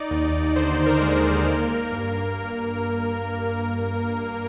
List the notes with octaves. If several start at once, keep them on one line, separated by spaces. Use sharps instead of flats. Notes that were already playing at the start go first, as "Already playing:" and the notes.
Already playing: D#4 D5
D#2
D3 C5
A#4
G#3
A#4
A#3
G2